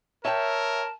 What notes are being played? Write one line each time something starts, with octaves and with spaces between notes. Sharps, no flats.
A#4 C#5 E5 G5 A5